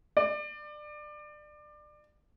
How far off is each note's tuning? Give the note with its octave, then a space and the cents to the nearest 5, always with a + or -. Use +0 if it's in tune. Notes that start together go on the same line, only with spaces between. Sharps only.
D5 +25